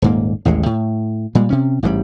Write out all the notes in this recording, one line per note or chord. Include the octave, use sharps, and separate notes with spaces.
D#1 G#2 A#3
A1 D#2 A2 G#3
A2
A#2 G3 G#3
C3 C#4
A1 G#2 C#3 G3